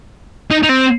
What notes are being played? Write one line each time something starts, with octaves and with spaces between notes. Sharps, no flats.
D#4
D#4
C4